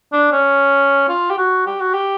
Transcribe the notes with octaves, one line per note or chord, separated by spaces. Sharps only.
D4
C#4
F4
G4
F#4
G4
F#4
G4